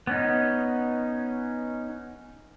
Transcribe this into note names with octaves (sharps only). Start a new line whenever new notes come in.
B3 C#4 D#4